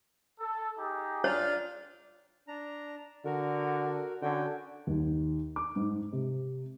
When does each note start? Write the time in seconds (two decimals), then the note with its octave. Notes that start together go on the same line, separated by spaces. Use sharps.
0.40 A4
0.78 D#4 G4 G#4
1.24 D4 F4 C#5
2.48 D4 A#5
3.25 D3 F#4 A#4
4.22 D3 C#4 F#4 G5
4.87 D#2
5.56 D6
5.76 G#2
6.12 C3